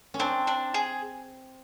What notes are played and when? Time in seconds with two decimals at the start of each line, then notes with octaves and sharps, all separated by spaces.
0.14 C#4
0.19 C4 D4
0.47 D4
0.74 G#4